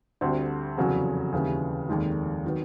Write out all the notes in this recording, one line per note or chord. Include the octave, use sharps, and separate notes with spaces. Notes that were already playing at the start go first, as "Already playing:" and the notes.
D2 D3 G3 C4
F1 E2 C#3 F#3
D#2 C#3 E3 G3
F1 D#2 D#3 G#3
D#3 F#3 B3